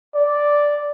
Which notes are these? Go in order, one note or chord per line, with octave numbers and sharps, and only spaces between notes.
D5